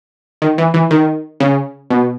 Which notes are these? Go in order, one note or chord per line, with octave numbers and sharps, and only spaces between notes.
D#3
E3
E3
D#3
C#3
B2